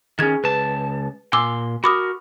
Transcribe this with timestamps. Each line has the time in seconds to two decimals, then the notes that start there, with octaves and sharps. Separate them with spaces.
0.19 D#3 C#4 G#4 G#6 E7
0.44 C#2 B4 A5
1.33 A#2 G#5 C6 D6 E6
1.84 F#4 A#4 B5 D6 D#6